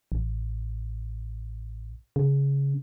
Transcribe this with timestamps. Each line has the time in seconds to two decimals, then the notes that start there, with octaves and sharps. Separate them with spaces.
0.12 A1
2.16 C#3